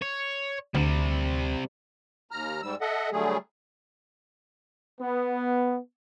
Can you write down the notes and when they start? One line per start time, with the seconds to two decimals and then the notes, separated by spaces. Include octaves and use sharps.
0.02 C#5
0.75 D2 C3 G3
2.31 D#2 A#5 F6
2.63 G#2 G3 E6
2.81 A4 D#5 E5 F#5
3.12 D3 F#3 G3 A3 G#4
5.01 B3